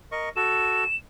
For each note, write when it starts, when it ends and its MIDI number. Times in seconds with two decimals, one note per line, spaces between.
0.12 0.29 70
0.12 0.29 75
0.12 0.29 85
0.36 0.84 66
0.36 0.84 69
0.36 0.96 100